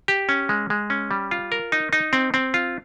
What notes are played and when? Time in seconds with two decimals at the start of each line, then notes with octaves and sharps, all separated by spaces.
0.08 G4
0.29 C#4
0.49 G#3
0.70 G#3
0.90 C#4
1.11 G3
1.31 F4
1.52 A#4
1.72 D#4
1.93 D#4
2.13 C4
2.34 C4
2.54 F4